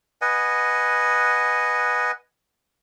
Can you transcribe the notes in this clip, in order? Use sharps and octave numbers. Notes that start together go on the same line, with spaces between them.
B4 D#5 F#5 G#5